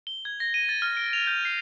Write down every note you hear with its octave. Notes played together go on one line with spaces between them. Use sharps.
G7
G#6
A#6
D#7
A6
F6
D7
F7
G6
C7